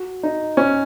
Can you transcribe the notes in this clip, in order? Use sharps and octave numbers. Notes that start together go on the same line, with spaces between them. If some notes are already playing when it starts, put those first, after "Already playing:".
Already playing: F#4
D#4
C#4